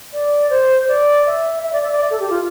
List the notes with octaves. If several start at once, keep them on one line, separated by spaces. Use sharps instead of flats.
D5
C5
D5
E5
E5
D5
E5
D5
A4
G4
F4